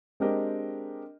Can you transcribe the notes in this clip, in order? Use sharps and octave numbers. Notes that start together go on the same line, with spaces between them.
G#3 C4 D4 G4 A#4 D#5